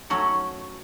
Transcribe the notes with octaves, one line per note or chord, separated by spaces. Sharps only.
F#3 A3 C#4 F#4